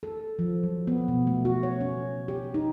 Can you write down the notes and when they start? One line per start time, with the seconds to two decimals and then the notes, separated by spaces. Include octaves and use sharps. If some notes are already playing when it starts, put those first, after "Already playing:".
0.03 A4
0.39 F3
0.63 F#3
0.87 B3
1.08 B2
1.27 A3
1.45 F#4
1.63 C#5
1.81 C#4
2.28 G4
2.54 D#4